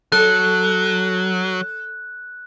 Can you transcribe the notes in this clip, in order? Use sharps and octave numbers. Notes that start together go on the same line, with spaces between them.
F#3 A4 F#6